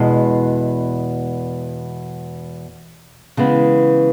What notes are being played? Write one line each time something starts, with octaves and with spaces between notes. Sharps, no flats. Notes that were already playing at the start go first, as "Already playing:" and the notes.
Already playing: E2 B2 G#3
C#3 E3 G#3 B3